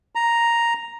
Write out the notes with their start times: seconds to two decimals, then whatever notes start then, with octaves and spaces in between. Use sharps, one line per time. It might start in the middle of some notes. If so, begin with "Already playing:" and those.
0.15 A#5